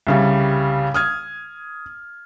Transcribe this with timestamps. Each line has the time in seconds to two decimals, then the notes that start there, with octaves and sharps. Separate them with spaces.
0.07 C2 C#3 G3
0.94 D#6 F6 G#6